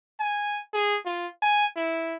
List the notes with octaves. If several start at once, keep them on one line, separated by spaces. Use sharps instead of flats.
G#5
G#4
F4
G#5
E4